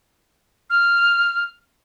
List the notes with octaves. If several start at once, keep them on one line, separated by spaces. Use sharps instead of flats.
F6